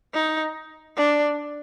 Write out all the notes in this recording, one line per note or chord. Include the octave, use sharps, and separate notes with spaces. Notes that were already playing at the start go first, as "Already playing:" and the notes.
D#4
D4